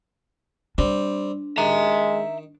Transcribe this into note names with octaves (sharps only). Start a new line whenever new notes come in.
G3 C4 D4
D#3 G#3 E5 A#5